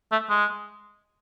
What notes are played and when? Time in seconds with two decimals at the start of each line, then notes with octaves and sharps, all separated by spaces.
0.11 A3
0.29 G#3